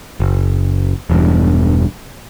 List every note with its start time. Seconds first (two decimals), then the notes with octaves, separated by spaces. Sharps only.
0.20 F#1
1.10 E1 E2 G2